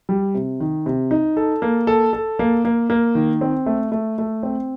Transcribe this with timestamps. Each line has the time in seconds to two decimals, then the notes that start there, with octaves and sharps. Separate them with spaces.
0.09 G3
0.34 C3
0.60 D#3
0.86 C3
1.11 D#4
1.37 A4
1.62 A#3
1.87 A4
2.13 A4
2.39 A#3
2.65 A#3
2.90 A#3
3.15 D#3
3.41 C4
3.66 A3
3.92 A3
4.18 A3
4.43 C4